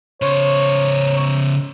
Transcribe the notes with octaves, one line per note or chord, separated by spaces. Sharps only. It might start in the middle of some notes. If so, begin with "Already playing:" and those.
C#3 C5 C#5